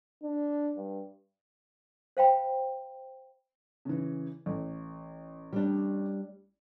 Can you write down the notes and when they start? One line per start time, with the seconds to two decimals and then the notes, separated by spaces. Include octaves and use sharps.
0.23 D4
0.77 G2
2.17 C5 F5 G5 B5
3.85 C#3 E3
4.46 A1
5.53 G3 D4